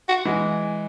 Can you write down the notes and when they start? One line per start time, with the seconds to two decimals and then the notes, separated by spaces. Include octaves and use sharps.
0.09 F#4
0.25 E3 G#3